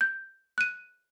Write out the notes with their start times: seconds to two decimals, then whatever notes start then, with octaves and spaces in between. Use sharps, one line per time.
0.01 G6
0.58 F#6 D#7